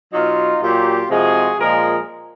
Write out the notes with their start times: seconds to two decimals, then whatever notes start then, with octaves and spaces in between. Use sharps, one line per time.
0.13 B2 F#3 D#4 F4
0.62 A#2 F#3 F4 G4
1.10 C3 F3 G#3 F#4 G#4
1.59 A#2 F3 G#3 G#4 A#4